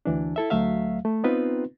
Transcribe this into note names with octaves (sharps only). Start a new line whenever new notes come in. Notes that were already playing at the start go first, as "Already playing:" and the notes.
D2 E3 D4
E4 A4 E5
D2 F#3 A3 E5 F5
A3
B3 C4 D#4 F4 B4